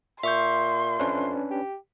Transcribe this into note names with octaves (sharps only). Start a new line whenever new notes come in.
A#2 E5 C6 C#6 G6
F2 C#4 D4 B4
G4